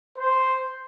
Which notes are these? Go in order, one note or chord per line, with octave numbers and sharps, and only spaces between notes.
C5